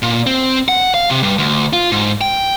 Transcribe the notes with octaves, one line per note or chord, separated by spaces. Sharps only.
A#2
C4
F#5
F5
C3
G2
D2
F4
G#2
G5